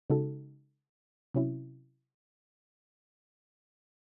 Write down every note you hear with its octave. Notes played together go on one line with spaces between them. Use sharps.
C#3 G#3 D#4 F#4 A4
C3 F#3 C#4 E4